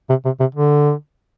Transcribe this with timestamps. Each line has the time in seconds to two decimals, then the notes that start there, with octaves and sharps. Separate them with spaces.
0.10 C3
0.25 C3
0.40 C3
0.55 D3